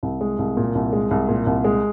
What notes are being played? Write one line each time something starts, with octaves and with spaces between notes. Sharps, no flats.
C2
G#3
C2
A#2
C2
G#3
C2
A#2
C2
G#3